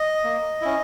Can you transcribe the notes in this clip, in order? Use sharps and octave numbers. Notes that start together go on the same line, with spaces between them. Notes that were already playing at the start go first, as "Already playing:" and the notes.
Already playing: D#5
A#3
C#4 E4